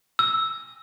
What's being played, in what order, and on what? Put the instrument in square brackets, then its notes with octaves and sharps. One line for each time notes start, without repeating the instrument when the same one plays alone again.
[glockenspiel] E6